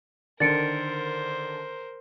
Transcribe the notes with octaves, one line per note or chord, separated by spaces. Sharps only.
D3 D#3 D4 A#4 C5 A6 C#7 D7